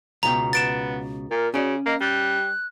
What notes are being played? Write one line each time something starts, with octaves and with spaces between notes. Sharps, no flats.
C#2 B2 G5 A#5
B3 A6 D7 E7
A#2 A#4
C#3 C#4 F#4 D5
A#3 D#5
G3 F#6